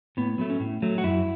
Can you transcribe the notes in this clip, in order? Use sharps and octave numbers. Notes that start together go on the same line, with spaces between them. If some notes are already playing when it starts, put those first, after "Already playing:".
A2 B3
F#3 A3 B3
C#4
A2
F#3 A3
F#4
F#2 E4